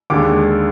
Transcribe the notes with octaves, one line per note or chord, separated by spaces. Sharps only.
D#2 D3 G#3 D6